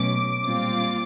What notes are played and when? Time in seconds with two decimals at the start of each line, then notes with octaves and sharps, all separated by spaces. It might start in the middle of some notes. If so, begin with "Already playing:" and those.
Already playing: B2 F#3 A3 C#4 D6
0.44 A#2 G3 C4 F4 D6